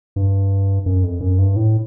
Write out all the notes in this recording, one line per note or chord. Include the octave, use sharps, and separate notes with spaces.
G2
F#2
F2
F#2
G2
A2